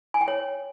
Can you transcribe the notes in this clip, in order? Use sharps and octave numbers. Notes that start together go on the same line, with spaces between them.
G#5
G5
C#5